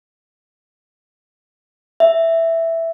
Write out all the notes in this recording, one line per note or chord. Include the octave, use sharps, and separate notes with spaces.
E5